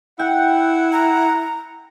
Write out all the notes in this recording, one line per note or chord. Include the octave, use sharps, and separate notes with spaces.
E4 F#5 G5
A#5